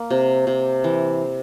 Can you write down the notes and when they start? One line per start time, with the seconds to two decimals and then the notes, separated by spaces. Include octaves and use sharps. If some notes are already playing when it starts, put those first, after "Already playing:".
Already playing: A#3
0.10 C3
0.47 C3
0.84 E3